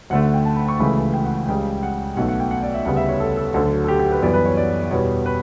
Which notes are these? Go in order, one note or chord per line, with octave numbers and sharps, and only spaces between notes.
D2 D3 A3 F#5
F#5
G5
A5
B5
C#6
C#2 C#3 E3 A3 B5
G5
F#5
C#2 C#3 G3 G5
F#5
B1 B2 A3 F#5
F#5
G5
F#5
D5
E5
D2 C#3 G3 B3 F#5
E5
C#5
A4
A4
D2 D3 F#3 A4
A4
G4
G4
B4
F#2 E3 G3 B3 D5
B4
C#5
D5
E2 B2 G3 B3 C#5
B4